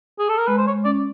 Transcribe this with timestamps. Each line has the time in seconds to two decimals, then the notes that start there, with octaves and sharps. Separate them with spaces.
0.19 G#4
0.29 A4
0.38 A#4
0.48 G#3 B4
0.58 C5
0.67 G#3 C#5
0.85 C#4 D5